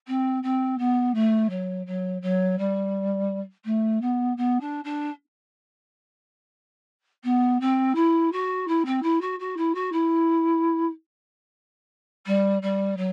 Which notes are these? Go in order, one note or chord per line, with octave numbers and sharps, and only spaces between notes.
C4
C4
B3
A3
F#3
F#3
F#3
G3
A3
B3
B3
D4
D4
B3
C4
E4
F#4
E4
C4
E4
F#4
F#4
E4
F#4
E4
G3
G3
F#3